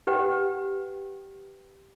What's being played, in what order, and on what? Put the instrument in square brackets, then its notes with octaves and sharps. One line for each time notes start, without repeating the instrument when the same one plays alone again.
[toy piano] G4 B4 F#5 G5